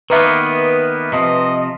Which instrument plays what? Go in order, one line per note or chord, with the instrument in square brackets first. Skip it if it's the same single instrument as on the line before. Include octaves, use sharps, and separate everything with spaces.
[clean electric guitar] D#3 A#3 B3 [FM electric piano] B4 E5
[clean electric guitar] C3 F3 [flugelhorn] D#5